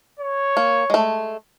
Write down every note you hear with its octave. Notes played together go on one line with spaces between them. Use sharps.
C#5
A#3
G#3 A3